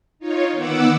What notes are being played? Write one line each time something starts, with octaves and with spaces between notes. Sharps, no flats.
D#4 F4 C#5
D#3 B3 F#5 D6 E6